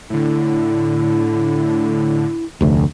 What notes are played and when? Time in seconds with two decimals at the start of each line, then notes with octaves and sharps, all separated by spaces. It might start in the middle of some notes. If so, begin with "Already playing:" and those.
0.10 A2 D3 E4
2.61 F1 D2